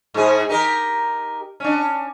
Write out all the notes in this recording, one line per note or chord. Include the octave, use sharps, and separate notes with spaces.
G#2 G#4
D#4 G4 A#4
C#4 D4